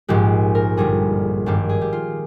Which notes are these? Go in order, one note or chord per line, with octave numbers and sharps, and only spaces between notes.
A#1 G#2 F3 G#3 G4
A#4
G1 G2 G3 G#4
G#1 G2 D#3 A#3 G4
G#4
G4
F4